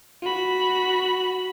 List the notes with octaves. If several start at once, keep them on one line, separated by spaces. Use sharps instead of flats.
F#4 B5